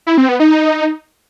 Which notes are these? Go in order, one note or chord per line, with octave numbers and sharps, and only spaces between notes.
E4
C4
B3
D#4